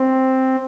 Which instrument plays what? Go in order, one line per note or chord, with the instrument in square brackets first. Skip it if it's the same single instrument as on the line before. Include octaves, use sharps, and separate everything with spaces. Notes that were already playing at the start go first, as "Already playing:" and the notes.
Already playing: [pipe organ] C4